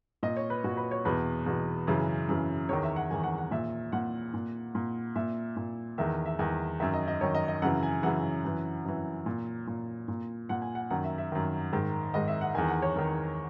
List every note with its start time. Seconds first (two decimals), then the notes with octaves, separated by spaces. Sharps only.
0.23 A#2 D#5
0.36 C#5
0.50 B4
0.64 A#2 F#4
0.77 B4
0.91 C#5
1.05 E2 B2 B4
1.46 E2 B2
1.87 F#2 C#3 E3
2.29 F#2 C#3 E3
2.69 E2 D#3 C#5
2.83 E5
2.96 F#5
3.11 E2 D#3 G#5
3.23 F#5
3.38 F#5
3.51 A#2 E5
3.92 A#2 F#5
4.34 A#2
4.75 A#2
5.16 A#2 E5
5.57 A#2
5.98 E2 D#3 E5
6.26 E5
6.39 E2 D#3 G#5
6.80 F#2 D#3 E5
6.94 D#5
7.08 D#5
7.21 F#2 D#3 C#5
7.35 D#5
7.48 D#5
7.62 F#2 C#3 E3 F#5
7.83 G#5
8.03 F#2 C#3 E3 F#5
8.44 F#2 E3
8.85 F#2 E3
9.26 A#2
9.67 A#2
10.08 A#2
10.49 A#2 F#5
10.62 G#5
10.75 F#5
10.90 F#2 D#3 F#5
11.04 E5
11.18 E5
11.32 F#2 D#3
11.73 G#2 D#3
12.14 G#2 D#3 D#5
12.28 E5
12.41 F#5
12.55 E2 D#3 G#5
12.68 F#5
12.82 C#5
12.95 E2 D#3 A#4